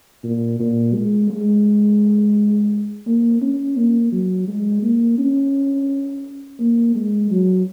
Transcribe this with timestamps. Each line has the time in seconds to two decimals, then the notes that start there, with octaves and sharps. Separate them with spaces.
0.24 A#2
0.60 A#2
0.94 G#3
1.30 G#3
3.06 A#3
3.42 C#4
3.77 A#3
4.12 F#3
4.47 G#3
4.83 A#3
5.18 C#4
6.60 A#3
6.95 G#3
7.31 F#3